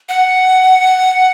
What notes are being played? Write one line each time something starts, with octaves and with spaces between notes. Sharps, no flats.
F#5